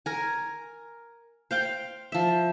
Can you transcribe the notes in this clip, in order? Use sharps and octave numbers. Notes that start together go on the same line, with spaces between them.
A#4 G#5
C5 F5 G5
F3 E5